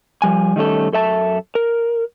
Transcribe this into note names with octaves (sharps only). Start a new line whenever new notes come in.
F3 G3 G#5
D#3 G3 A3 C#4 A4
F#2 A4 E5 A5
A#4